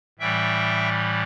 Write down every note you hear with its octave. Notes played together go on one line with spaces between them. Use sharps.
A2 E3 G3 E5 G5